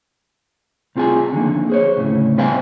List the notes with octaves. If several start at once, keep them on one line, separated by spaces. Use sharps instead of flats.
C2 C4 F4 G#4 G#5
D3 D#3 F3 A#3
G#4 C5 C#5
D2 A2 C#3
G3 B3 C5 F5 G5 G#5